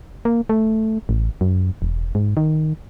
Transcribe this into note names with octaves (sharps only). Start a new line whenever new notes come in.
A#3
A3
A1
F#2
E1
G#2
D#3